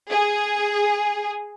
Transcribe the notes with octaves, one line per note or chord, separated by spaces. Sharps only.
G#4